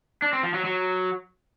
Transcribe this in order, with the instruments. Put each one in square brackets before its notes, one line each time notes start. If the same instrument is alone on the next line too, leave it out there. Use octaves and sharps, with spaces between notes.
[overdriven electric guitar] D4
C4
F3
F#3
F#3